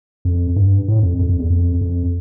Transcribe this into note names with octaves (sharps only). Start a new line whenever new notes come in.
F2
G2
A2
F2
F2
F2
E2
F2
F2